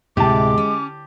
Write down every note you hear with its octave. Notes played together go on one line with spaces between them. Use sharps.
D2 A2 C3 G#3 G4 A5 D6
C#4